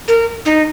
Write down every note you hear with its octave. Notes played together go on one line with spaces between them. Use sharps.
A#4
D#4